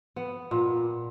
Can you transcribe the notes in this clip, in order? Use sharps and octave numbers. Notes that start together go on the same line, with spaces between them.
B3
A#2